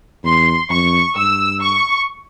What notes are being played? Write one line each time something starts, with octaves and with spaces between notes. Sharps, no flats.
E2 C6
F2 C#6
G2 E6
C#6